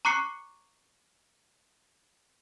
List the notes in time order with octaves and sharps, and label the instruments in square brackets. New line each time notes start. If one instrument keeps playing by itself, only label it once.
[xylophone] A#5 C#6 D6 F#6 C7 C#7